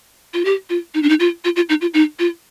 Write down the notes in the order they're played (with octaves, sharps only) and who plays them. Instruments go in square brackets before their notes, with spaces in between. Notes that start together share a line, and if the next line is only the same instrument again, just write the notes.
[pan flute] F4
G4
F4
D#4
D4
D#4
F4
F4
F4
D#4
F4
D#4
F4